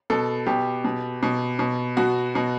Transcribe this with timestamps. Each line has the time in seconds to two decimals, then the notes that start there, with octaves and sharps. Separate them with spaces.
0.10 B2 A4
0.46 B2 G4
0.85 B2
1.23 B2
1.59 B2
1.97 B2 F#4
2.35 B2